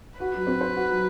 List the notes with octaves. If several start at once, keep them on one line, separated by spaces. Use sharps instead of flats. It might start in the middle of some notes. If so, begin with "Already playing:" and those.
F#4 B4
F#3
C4
C5
F#4
F#3